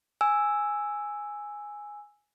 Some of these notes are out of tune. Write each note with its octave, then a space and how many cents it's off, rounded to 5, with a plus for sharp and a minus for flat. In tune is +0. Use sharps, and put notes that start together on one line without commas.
G#5 +0 E6 +0